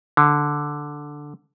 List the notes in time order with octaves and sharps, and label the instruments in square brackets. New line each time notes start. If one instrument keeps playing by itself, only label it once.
[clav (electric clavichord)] D3